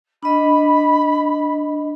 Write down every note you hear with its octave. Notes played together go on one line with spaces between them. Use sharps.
D4 D#5 B5